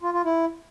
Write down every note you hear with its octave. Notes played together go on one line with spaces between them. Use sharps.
F4
F4
E4